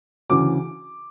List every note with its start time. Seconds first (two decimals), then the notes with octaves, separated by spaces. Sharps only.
0.30 D2 C#3 E3 D6